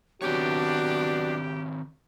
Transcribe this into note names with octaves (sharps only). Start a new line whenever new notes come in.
D#3 F#3 B3 C4 D4 F#4 G4 C#5